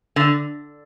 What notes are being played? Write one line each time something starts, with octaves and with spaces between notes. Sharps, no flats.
D3